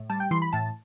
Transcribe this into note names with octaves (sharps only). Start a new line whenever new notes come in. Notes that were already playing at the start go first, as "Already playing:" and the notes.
Already playing: A2
G3 A5
G5
E3 C6
B5
A2 A5